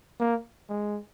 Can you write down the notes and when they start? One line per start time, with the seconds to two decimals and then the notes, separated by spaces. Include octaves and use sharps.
0.20 A#3
0.69 G#3